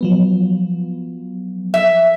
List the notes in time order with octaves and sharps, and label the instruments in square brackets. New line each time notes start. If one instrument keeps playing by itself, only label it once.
[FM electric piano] F3 F#3 B3
[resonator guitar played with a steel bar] E5